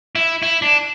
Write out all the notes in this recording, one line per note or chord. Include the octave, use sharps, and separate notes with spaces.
E4
E4
D4